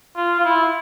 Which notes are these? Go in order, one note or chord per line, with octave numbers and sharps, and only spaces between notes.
F4
F4
E4